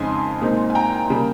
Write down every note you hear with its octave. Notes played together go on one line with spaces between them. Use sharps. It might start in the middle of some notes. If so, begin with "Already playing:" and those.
Already playing: F2 C#3 G#3 D#4 G#5 C6
A#2 G#3 C4 D#4
G#5
G5 A#5
C#3 G3 A#3